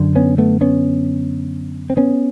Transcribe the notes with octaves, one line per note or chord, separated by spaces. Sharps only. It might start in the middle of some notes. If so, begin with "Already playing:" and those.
Already playing: F#2 D3
B3 C#4
A3 B3
B3 C#4
C4
B3 C#4